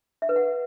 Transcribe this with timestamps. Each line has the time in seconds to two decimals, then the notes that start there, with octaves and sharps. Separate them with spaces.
0.22 E5
0.29 B4
0.36 F#5